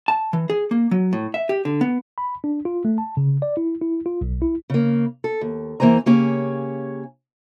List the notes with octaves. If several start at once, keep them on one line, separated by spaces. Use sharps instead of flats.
A5
E3
G#4
A#3
F#3
A2
E5
G4
D3
B3
B5
D4
F4
A3
A5
C#3
D5
E4
E4
F4
B1
E4
C#3 A#3
A4
D#2
E2 E3 A#3 C5 G#5 A#5
C#3 A#3 C#4 G4 C#5 G#5